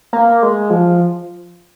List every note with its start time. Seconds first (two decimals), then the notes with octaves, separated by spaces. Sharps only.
0.13 A#3
0.43 G#3
0.70 F3